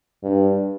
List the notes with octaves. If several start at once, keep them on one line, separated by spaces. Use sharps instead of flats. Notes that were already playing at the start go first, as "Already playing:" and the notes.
G2